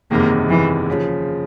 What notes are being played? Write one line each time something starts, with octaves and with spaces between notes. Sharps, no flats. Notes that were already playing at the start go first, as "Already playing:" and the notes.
F#1 E2 C3 D#3 G#3 A#3
E3
C#3 F3